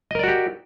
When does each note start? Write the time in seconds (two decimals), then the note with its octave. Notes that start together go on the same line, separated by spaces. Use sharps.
0.11 D#5
0.15 A#4
0.19 D5
0.24 F#4
0.28 G4